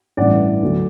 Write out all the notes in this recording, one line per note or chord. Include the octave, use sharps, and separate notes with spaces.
A1 G2 E3 D5 F#5
D2 D3 F#3